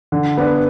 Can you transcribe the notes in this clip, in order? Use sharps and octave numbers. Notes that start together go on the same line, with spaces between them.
D3
B3 D4 B4